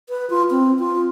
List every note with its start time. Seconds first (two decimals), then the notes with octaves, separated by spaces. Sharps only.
0.09 B4
0.30 F4
0.51 C4
0.79 F4